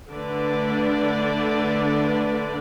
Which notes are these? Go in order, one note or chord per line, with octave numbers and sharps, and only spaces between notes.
D3 A3 D4 B4 D5